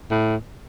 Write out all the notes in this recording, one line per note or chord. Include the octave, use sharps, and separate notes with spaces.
A2